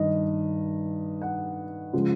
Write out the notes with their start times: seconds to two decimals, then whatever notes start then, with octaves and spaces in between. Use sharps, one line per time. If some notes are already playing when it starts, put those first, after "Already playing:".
Already playing: G2 D#3 G3 D#5
1.22 F#5
1.93 C#3 F3 G#3